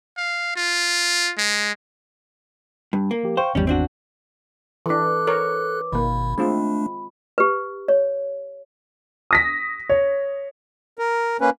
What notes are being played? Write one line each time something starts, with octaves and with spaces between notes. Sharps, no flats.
F5
F4
G#3
G2
A#3
F3 G4
C5 F5 G5 C#6
G#1 E2 G3 C#4
C4 D4 F#4
E3 D4 A4 B4 D6 F#6
A#4 C#5
G#1 B2 D#3 A#3 B5
G#3 A3 C4 D4 F4
G4 B4
C#5
D#6 A#6 B6
C#5
A#4
A#3 C#4 B4